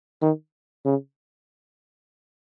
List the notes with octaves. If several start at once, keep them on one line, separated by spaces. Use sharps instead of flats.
D#3
C#3